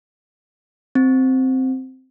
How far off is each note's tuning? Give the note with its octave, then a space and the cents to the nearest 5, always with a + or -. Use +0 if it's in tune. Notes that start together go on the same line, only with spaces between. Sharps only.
C4 -5